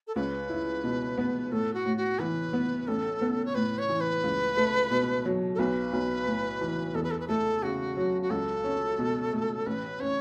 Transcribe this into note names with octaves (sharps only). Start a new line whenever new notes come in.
A4
C#2 B4
E4
B2
B3
A2 A4
F#4
A2
F#4
E3 B4
B3
A1 A4
B3
C#5
A2 B4
C#5
E3
B4
C#2
A3
B2
F#3
A4
B1 B4
B1
A2
E3
E2 A4
B4
A4
B4
A3 A4
C#3 F#4
F#3
F#4
C#2 A4
C#4
B2
A3
A1 B4
C#4 C#5